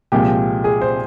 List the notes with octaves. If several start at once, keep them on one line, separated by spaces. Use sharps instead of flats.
C2 A#2 F3 G#3 G4
G#4
C5